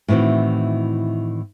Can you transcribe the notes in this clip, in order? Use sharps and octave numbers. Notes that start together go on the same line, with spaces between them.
A2 D#3 E3 C4 F#4